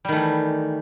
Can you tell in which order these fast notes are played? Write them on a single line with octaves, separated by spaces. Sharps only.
G3 D#3 A3 E3